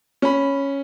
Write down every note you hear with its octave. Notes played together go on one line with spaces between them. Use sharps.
C#4 B5